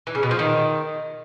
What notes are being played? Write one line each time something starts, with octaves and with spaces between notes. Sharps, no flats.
E3
C#3
B2
F3
D#3